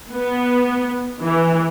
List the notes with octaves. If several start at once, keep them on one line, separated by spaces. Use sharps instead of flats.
B3
E3